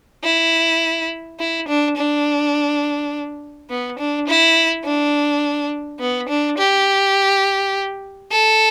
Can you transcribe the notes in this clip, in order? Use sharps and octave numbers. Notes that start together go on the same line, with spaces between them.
E4
E4
D4
D4
B3
D4
E4
D4
B3
D4
G4
A4